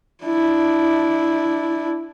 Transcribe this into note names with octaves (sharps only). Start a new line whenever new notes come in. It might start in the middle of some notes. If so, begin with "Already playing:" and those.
D4 E4